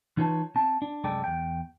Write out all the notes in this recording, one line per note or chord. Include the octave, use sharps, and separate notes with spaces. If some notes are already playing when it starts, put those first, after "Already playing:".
E3 D#4 F4 B4 C#5 A5
C4 A5
D4
C2 F#2 G#3 A4 D5 G5
E2 G5